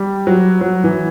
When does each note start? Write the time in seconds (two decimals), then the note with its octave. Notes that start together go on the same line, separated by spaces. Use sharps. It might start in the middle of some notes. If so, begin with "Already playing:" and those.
Already playing: G3
0.27 F#3
0.61 F#3
0.84 E3